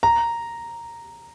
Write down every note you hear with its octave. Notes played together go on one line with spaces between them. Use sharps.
A#5